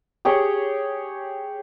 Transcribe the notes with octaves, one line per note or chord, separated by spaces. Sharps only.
G4 G#4 C#5 G5